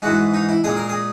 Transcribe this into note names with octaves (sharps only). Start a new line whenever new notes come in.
G#2 E3 G#3 F#4
D#4
E4
A#2 G#3 G#4
A#4
G#4